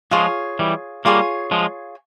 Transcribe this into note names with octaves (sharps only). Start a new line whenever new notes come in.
F3 G#3 F4 G#4 C#5
E3 G3
G3 A#3 F4 G#4 C#5
F3 G#3